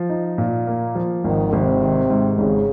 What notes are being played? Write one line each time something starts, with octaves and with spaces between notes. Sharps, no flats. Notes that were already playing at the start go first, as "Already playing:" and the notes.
Already playing: F3
D#4
A#2
A#3
F3
G#1 D#3
G#1 C3
D#3
G#2
G#1 C#3